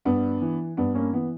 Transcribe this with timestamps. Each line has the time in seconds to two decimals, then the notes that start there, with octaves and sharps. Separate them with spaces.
0.05 G2 B3 D4
0.41 E3
0.77 G2 B3 D4
0.95 A#3 C#4
1.13 E3 B3